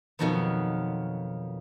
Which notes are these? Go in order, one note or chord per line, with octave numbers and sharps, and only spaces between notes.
F2 B2 D#3 F3 F#3 B3